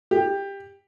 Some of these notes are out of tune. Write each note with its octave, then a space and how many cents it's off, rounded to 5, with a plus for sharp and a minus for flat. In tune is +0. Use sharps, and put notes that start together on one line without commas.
G4 +15